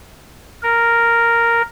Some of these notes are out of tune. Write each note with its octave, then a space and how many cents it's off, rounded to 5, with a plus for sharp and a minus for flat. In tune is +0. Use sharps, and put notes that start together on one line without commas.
A#4 -5